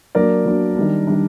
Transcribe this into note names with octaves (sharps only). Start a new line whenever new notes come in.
F#3 A#3 D4 A#4 D5
F#3 A#3 D4
D#3 G3 D4
D#3 G3 D4